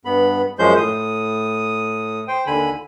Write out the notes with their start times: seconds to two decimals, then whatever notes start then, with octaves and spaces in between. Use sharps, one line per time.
0.05 G2 B3 B5
0.59 F#2 F3 G#3 C#4 C5 G6
0.77 A2 D#6
2.28 C5 G5
2.47 D#2 D3 G#5 B5